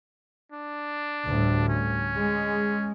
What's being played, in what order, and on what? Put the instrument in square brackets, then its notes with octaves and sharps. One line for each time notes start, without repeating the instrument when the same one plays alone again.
[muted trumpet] D4
[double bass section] D2 A2 G3
[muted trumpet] C#4
[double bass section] G#3